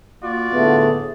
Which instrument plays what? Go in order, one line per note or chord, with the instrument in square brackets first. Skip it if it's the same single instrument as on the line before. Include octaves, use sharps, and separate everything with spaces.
[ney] A#3 [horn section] F4 F#4 D5
[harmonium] A2 D3 A3 [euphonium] B3 [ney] G#4